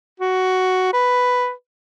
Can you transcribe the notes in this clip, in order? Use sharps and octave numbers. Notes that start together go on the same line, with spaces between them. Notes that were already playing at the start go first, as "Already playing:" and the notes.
F#4
B4